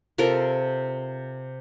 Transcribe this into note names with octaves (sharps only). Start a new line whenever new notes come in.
C3 F4 A4 A#4